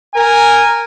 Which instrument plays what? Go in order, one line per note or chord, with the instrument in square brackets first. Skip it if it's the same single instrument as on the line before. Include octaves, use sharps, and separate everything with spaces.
[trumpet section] A#4 G#5